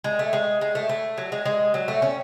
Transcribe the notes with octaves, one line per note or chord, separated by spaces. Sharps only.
G#3
A3
G#3
G#3
A3
A3
F#3
G#3
G#3
F#3
A3
C#4